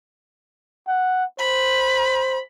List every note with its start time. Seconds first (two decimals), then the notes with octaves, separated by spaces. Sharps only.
0.88 F#5
1.39 C5 B5